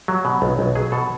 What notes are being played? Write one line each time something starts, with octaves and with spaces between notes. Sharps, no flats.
F#3
B2
B1
B1
F#3 G#4
B2 A4